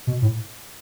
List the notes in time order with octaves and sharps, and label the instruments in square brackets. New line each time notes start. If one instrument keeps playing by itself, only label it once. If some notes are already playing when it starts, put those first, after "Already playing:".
[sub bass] B2
A2